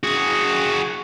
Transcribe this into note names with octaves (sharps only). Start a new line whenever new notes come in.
F#4 G#4